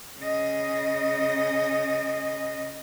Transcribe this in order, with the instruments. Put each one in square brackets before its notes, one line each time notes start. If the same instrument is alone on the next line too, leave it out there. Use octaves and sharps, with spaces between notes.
[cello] C#3 D#5